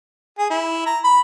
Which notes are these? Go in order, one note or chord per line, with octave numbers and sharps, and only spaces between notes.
G#4
E4
A#5
B5